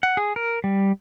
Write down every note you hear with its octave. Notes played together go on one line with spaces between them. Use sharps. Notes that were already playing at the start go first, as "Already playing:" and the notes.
F#5
G#4
A#4
G3